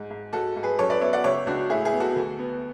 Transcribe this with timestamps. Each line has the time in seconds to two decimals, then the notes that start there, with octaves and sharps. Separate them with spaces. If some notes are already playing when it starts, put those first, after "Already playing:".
Already playing: G#2
0.10 G#2
0.33 G#2 F#4 A4
0.56 G#2
0.63 G#4 B4
0.79 F#2 A4 C#5
0.90 B4 D5
1.01 B3 C#5 E5
1.13 D5 F#5
1.24 C#2 C#5 E5
1.47 C#2 D4 F#4
1.70 A2 E4 G#4
1.85 E4 G#4
1.93 B3
2.00 F#4 A4
2.16 D2
2.39 B3